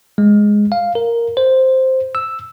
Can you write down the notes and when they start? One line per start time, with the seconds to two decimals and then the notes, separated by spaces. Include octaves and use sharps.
0.18 G#3
0.72 F5
0.95 A#4
1.37 C5
2.15 E6